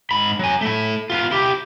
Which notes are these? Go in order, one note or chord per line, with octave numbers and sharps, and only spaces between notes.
G#2 B5
F#3 G#5
A3 E4
B3 F4
E4 G4